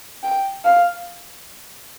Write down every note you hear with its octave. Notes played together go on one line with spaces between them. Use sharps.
G5
F5